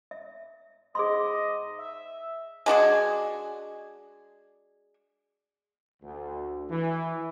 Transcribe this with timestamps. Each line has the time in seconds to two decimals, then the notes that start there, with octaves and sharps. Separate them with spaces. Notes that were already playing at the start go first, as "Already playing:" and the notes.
0.11 E5
0.95 G#2 G#4 D#5 C6
1.79 E5
2.66 G#3 D4 F#4 G#4
6.02 D2
6.70 E3